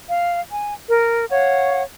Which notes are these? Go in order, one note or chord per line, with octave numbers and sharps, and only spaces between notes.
F5
G#5
A#4
C#5 F5 F#5